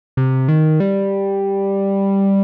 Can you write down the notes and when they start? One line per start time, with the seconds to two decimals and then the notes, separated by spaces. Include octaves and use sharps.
0.17 C3
0.48 D#3
0.80 G3